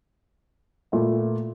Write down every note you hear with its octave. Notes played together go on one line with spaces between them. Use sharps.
A#2 A3 E4